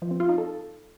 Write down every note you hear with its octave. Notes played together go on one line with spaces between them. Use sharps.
F3
C4
F4
D#4
A4